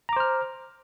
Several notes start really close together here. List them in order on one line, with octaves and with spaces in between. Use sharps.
A#5 D6 C5 F6